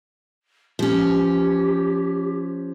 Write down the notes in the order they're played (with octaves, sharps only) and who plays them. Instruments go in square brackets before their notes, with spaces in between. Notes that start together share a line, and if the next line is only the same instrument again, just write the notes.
[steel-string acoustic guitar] F3 C#4 [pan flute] G4